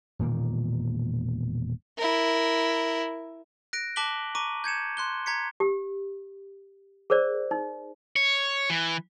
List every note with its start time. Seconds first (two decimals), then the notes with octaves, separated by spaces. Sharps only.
0.19 E1 A#2 D#3 A#3
1.98 E4 A#4
3.73 F#6 A#6 D7
3.96 A5 D6 F#6 B6 F#7 G7
4.35 A#5 C#6 D6 D#7
4.64 G6 G#6 C#7 E7
4.97 C6 F#6 G7
5.26 A#5 G#6 B6 C#7
5.60 G4
7.10 G#4 A#4 C5 D5
7.51 D#4
8.16 C#5
8.70 E3